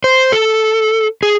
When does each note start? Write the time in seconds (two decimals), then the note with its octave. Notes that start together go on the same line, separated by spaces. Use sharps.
0.04 C5
0.32 A4
1.23 G#4